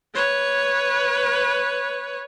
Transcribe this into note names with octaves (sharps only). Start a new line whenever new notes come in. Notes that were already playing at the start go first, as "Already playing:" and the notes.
B4 C#5